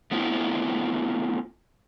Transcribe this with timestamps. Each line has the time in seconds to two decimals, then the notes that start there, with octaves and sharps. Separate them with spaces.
0.11 A3 B3 C4 D4 E4 F4